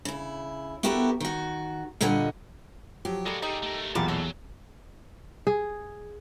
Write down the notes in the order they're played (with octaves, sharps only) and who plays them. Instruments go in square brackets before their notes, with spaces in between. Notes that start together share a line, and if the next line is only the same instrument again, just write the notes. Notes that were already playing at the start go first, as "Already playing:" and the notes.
[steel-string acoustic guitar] C#3 E4
B3 E4 F#4 G4 A4 A#4
D#3 F#4
A#2 D3 G3 C#5 D#5 F#5
[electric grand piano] F3 F#3 [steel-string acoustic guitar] G4
[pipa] G3 A#3 [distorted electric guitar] G#3 F#4 [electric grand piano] A4
[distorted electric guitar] G3 G#4 [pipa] D#4
[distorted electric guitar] A3 A#4
[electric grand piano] B1 A#2 B5 [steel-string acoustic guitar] E2 [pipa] F4 G4 A#4 [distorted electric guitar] A5
[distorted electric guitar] F#3 [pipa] A4
[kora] G#4